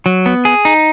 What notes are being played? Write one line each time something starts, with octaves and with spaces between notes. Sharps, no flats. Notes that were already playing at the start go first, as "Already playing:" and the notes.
F#3
B3
G#4
D#4